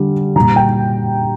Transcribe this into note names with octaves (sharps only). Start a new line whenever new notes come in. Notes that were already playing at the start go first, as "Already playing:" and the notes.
Already playing: D3 G3
A#2 G3 A#5
G5